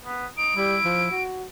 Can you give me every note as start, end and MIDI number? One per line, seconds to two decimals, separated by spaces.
0.04 0.26 59
0.37 0.53 63
0.37 1.23 98
0.56 0.77 55
0.56 1.16 64
0.84 1.08 53
1.11 1.45 66